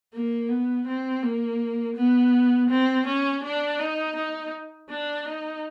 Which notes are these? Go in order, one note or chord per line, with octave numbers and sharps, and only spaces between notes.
A#3
B3
C4
A#3
B3
C4
C#4
D4
D#4
D#4
D4
D#4